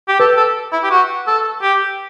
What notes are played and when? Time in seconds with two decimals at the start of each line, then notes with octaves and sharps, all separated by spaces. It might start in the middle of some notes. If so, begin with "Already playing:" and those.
0.08 G4
0.20 A4 B4
0.37 A4
0.73 E4
0.84 G4
0.91 F#4
1.27 A4
1.63 G4